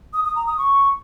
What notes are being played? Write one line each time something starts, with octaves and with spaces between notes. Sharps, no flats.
D#6
D#6
A#5
D#6
C#6